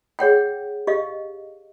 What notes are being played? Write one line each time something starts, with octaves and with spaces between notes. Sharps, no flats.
G#4 C#5 F#5 G5
G4 D#5 F5